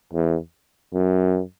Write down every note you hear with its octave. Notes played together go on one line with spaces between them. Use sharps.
E2
F#2